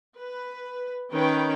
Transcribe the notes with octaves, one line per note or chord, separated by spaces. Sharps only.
B4
D#3 C#4 B4 G5